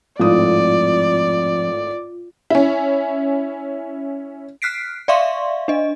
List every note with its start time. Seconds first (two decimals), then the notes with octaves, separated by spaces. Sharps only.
0.20 G#1 F2 A2 F4 D5 D#6
2.50 C#4 E4
4.62 F6 F#6 B6 C7 D7
5.08 D5 E5 F5 C6 C#6
5.68 D4 D#5